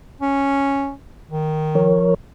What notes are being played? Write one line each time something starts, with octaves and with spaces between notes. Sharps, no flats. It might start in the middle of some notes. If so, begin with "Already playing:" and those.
C#4
D#3
F3 A#4 C#5